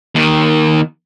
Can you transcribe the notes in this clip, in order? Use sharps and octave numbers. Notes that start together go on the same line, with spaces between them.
D#2 D#3